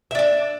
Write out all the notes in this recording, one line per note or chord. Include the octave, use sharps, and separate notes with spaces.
D4 D5 E5